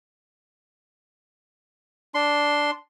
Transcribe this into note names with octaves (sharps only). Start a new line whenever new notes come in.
D4 C6